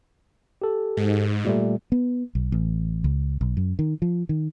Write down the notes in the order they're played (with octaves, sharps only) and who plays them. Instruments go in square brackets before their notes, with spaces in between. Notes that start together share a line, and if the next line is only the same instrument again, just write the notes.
[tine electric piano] G4 A4
[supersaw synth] G#2
[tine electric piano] A#2 G3 A3
[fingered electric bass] B3
B1
A1
C#2
B1
F#2
D#3
F3
D#3